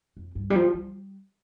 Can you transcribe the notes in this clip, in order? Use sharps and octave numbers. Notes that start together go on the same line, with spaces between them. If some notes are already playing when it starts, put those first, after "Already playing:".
F2
G2
G3
F3
G3